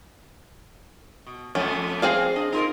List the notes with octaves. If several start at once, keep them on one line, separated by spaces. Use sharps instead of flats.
B2
F2 A3 B3 C#4
C4 G#4 F5
D4 D#5
D#4 F4 A#4